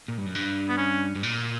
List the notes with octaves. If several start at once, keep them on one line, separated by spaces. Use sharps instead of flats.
A#2
G2
F#2
G2
B3
C#4
G2
A#2